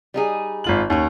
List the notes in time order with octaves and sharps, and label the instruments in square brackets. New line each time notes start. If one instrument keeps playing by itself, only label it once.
[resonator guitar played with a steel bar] G3 D#4 G#4
[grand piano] G#1 F4 F#7
[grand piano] D#2 [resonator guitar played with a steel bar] C#4 C#5